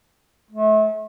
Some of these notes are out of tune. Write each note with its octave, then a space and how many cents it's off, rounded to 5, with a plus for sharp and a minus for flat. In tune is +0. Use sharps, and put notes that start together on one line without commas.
A3 -35